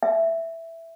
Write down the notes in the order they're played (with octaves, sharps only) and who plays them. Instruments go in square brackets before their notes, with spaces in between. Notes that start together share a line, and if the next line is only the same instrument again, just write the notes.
[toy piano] E5